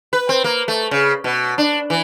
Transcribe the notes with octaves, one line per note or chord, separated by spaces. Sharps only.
B4
C4
A#3
A3
C#3
B2
D4
E3